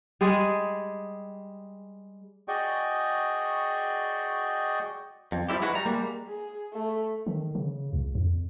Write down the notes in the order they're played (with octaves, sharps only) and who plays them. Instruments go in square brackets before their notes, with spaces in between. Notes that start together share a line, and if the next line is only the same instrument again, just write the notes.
[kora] G3 G#3 G#4
[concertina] F#4 G#4 D5 D#5 G5 C#6
[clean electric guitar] F2
F3 G3 A#3 E4 G4
G#3 E4 F#4 B4
G3 A#5
G3 G#3 A#3
[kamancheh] G#4
A3
[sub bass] D#3
C#3
C#2
F2